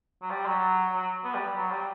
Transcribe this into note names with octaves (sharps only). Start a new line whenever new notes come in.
F#3
G3
F#3
F#3
B3
G3
F#3
G3